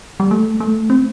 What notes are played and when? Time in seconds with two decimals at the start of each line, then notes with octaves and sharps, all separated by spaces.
0.20 G3
0.31 A3
0.60 A3
0.90 C4